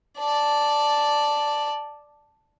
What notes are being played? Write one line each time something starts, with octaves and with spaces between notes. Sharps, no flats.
D5 A5